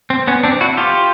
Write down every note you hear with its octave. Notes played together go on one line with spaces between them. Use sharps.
C4
B3 C#4
C4 D4
E4 F#4
F4 G4